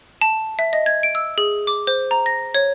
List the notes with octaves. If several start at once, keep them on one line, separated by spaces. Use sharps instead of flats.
A5
E5
D#5
G#6
D7
E6
G#4
D6
C5
A#5
A#6
C#5